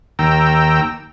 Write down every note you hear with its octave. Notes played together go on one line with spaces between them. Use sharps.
D#2 G5 A#5 E6